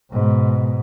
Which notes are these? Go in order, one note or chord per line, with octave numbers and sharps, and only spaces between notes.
G#2 B2